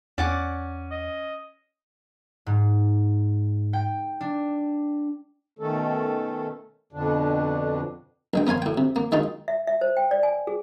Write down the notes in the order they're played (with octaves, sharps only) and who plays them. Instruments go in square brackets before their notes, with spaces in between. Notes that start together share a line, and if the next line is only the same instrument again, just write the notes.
[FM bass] E2 [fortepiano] C#4 [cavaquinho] D5 F#5 D6
[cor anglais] D#5
[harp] G#2
G5
D4
[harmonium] B2 D#3 A3 C#4 A4
F2 B2 D3 D4
[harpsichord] A#1 G#3 G5
B3 A#4 F5 G#5 C6
A2 G5
C3
A#3
D#3 G#3 D#4 F4
[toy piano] E5
E5
C5
G5
D5
G#5
G#4